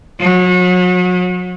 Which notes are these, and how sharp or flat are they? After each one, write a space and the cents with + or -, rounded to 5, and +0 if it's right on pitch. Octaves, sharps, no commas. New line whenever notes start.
F#3 -35